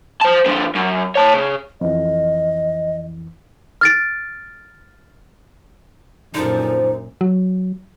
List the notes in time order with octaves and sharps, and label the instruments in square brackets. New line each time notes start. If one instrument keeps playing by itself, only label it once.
[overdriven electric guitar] C5 A5
D3 F3
F#2
C#5 A5
C#3
[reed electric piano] F2 E3 [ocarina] D#5
[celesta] F6 A6 D7
[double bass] F#2 A#2 [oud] D3 F3 [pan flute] D#4
[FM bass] F#3